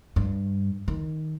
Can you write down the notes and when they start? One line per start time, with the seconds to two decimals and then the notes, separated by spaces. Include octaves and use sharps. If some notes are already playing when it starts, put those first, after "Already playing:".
0.16 G2
0.88 D#3